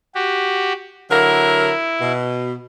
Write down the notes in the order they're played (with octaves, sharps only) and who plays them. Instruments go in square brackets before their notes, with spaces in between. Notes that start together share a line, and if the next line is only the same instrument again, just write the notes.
[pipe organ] F#4 G4
[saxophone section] D3 F#3 A#4 [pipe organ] E4
[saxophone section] B2